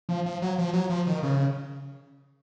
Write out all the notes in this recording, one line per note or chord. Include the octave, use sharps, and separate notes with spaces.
F3
F3
F#3
F3
F#3
F3
D#3
C#3